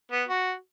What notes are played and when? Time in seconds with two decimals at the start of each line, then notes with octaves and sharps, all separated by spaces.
0.11 B3
0.28 F#4